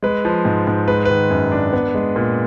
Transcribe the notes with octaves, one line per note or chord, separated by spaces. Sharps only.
G#3 B4
F3
G#2
G#2
G#3 B4
D#3 B4
F#2
D4
B3
G#3
A#2